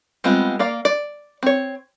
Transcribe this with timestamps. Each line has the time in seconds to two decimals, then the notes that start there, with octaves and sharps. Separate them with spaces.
0.24 G3 G#3 B3 C4 F4
0.59 A#3 D5 F5
0.85 D5
1.43 C4 C#5